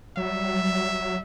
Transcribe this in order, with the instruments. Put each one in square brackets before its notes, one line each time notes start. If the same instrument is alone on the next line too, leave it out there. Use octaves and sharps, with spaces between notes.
[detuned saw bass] F#3 [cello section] G3 [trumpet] E5